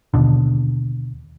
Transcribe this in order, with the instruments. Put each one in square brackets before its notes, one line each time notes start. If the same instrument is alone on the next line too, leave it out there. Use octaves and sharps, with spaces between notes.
[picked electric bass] D#2 B2 D3